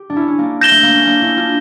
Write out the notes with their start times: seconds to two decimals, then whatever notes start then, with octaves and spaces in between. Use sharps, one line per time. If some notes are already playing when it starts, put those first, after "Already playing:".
Already playing: G4
0.10 D4
0.16 C#4 E4
0.28 C#4
0.38 A#3 D4
0.61 G6 A#6 E7 G7
0.71 A3
0.83 A#3
0.95 C#4
1.07 A#3 D4
1.21 C#4 E4
1.37 D4 F4